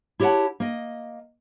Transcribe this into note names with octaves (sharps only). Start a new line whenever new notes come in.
E4 G4 C#5 E5 F#5 A5
A#3 D#5